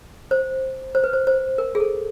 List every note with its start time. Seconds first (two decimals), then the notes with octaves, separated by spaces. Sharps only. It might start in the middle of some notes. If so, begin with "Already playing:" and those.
0.31 C5
0.95 C5
1.04 B4
1.13 C5
1.27 C5
1.58 A#4
1.75 G#4
1.80 A4